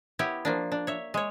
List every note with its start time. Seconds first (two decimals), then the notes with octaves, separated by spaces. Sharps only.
0.19 B3 E4 G4 C#5
0.45 F3 A#3 D4
0.72 D4
0.87 C#5 E5
1.14 G#3 C#5